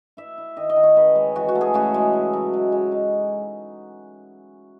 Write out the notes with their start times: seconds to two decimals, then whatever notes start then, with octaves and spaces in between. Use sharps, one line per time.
0.17 E4 E5
0.38 E4
0.57 D#3 D#5
0.69 D#5
0.76 D#3
0.83 C#5
0.97 C#3 B4
1.15 G#3
1.36 E3 F#4
1.48 F#4
1.55 A3
1.61 G#4
1.74 C#3 F#4
1.94 G#3
2.13 E4
2.33 F#3
2.53 G#3
2.72 G#3
2.92 D#4